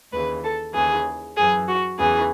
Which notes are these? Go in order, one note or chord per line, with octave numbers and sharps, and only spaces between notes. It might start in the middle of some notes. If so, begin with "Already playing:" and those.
D#2 C#3 E3 B4
A4
D#2 C#3 E3 G#4
F#2 E3 G#4
F#4
E2 C#3 E3 G#4